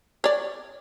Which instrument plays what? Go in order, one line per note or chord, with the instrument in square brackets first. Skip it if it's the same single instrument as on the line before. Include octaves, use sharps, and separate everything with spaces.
[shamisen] C#5 D5